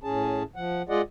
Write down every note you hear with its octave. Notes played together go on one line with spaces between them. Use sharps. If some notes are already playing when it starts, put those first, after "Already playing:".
A2 C#4 G#4 A5
F3 F#5
G#3 F4 G#4 D5 D#5 F#5